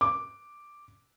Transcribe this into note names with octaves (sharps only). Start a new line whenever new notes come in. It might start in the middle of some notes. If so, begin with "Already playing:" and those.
D6